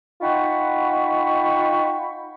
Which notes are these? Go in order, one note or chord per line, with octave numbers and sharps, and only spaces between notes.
D#4 F4 F#5 G5 B5 C#6